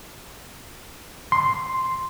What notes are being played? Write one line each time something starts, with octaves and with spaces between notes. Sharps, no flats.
C6